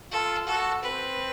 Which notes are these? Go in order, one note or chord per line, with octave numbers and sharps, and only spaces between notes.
F4 A4
F#4 A4
C4 B4